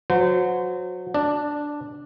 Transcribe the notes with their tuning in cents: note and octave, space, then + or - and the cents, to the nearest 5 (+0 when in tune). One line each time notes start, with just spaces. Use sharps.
F#3 -25 C5 -35
D4 +0 D5 +20